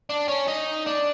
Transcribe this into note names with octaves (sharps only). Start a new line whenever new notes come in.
D4
C#4
D#4
D4